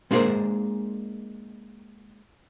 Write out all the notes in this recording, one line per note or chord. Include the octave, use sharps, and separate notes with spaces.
G#3 A#3 D4 G#4 A#4 C5